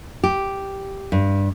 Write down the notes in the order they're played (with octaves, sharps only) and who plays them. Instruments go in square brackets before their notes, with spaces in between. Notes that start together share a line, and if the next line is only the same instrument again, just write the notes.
[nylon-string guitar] G4
G2